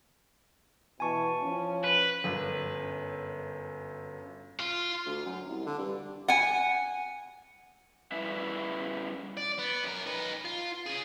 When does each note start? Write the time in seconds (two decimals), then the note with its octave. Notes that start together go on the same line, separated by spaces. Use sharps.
1.00 B2 E3 G#5 A5 C#6
1.42 F3 C#4
1.84 B4
2.24 G1 F#2
4.60 F4
5.06 D2
5.26 F#2
5.49 C2
5.66 D3
5.79 G2
6.28 F#5 G#5
8.12 G3 C#4 E4 B4 E5
9.37 D5
9.58 B3
9.84 F#2 A#4
10.06 D#4 B4
10.45 F4
10.86 C#3 G#4